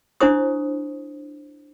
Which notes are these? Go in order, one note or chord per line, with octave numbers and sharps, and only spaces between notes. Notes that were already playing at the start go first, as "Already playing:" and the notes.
D4 E4 C5 C#6 D#6